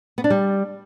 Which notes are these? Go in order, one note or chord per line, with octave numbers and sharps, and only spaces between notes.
B3
D4
G3